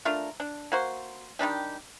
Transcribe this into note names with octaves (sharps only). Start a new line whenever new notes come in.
A3 D4 F4 A#4
D4
A#3 F#4 C5
D#3 G3 D4 G4